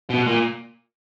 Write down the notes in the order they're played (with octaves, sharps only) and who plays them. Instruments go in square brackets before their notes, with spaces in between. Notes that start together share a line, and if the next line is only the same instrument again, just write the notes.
[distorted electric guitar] B2
A#2